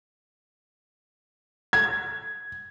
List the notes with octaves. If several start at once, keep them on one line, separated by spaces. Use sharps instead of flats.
G#6